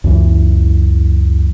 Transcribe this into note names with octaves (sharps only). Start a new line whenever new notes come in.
C#2 F#2 E3